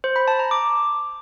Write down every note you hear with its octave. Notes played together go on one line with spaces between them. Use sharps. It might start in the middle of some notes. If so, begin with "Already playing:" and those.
C5
B5
A5
A#5
D6